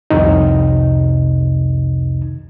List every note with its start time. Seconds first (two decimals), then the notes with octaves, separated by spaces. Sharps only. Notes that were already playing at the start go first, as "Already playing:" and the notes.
0.10 C2 F2 C3 D#3 D#4